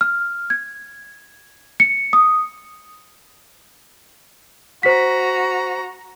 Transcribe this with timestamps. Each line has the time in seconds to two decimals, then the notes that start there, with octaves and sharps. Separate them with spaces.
0.01 F6
0.50 G#6
1.80 C#7
2.13 D#6
4.83 F#4 C5 A#5 B6